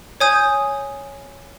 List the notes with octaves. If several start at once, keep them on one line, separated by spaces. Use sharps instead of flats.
C#5 G#5 D#6 G6